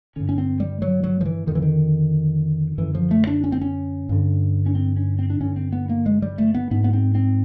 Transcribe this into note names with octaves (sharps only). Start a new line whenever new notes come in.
G2 D3 C#4
C#4
C4
G3
F#3
F#3
F3
E3
F2 D3 D#3
E3
D#3
F#2 D3 E3
F3
A3
D4
C#4
C4
C#4
G2 D3
C#4
C4
C#4
C4
D4
G2 D3 C#4
C4
B3
A#3
G#3
G3
A3
B3
G#2 B3
B3
C4
C4